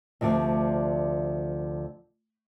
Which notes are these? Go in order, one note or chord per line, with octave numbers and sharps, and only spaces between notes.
D2 C3 F3 D5